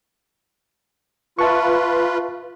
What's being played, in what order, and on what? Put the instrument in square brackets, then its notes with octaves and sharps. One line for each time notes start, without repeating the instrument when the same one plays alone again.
[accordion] F4 B4 [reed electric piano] E5 A5 C#6